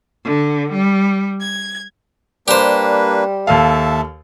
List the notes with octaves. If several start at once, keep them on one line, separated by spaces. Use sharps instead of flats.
D3
G3
G#6
G3 A#3 D4 G4 B4 C5
D#2 A4 E5 F5 A5